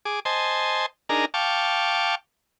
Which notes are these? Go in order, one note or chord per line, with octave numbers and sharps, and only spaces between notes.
G#4 D6
C5 D#5 G#5 A5 C6
D4 D#4 G#4 A#4 A#5
F5 G5 A5 C#6 D6